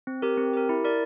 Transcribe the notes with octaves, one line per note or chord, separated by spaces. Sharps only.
C4
G4 A#4
C4
G4 A#4
E4
A#4 D5